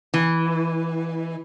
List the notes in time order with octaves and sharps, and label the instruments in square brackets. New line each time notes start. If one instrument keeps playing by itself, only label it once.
[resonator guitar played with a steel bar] E3